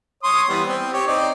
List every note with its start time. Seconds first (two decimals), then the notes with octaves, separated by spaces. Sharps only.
0.23 C#5 C6 D#6
0.49 E3 G3 B3
0.66 C4
0.93 G4 C#5
1.07 C4 D#4 D5